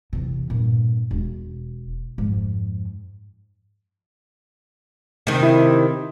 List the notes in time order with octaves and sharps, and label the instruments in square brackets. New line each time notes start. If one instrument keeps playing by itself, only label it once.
[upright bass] E2 C3
G2 A#2
E1
F2 G#2
[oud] C3 D#3
[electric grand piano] E4 E5